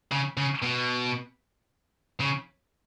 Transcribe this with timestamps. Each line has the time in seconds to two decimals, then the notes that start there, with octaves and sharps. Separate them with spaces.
0.11 C#3
0.37 C#3
0.63 B2
2.20 C#3